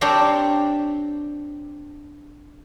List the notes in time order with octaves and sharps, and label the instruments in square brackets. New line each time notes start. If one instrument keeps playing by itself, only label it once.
[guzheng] C4 D4 G4 A#4 C5 C#5